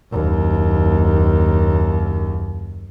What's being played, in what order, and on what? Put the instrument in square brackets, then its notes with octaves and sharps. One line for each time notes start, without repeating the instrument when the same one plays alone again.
[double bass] F#1 D#2